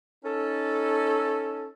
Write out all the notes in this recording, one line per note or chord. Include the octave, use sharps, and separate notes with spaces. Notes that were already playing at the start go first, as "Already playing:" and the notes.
C#4 D#4 A4